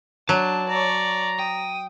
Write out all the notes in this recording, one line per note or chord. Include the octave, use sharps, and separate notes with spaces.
F#3 D4 A5
C#5 D5 A#5
G5 D#6